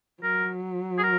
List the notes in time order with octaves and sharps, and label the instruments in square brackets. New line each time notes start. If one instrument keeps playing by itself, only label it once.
[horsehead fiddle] F#3 [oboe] A#4
[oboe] G#4
A#4